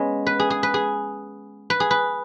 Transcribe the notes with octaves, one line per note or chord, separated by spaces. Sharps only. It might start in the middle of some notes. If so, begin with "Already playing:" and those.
Already playing: G#3 B3 C#4
B4
G#4
G#4
B4
G#4
B4
G#4
B4